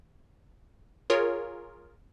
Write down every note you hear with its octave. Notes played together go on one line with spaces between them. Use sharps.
F4 G#4 A#4 C#5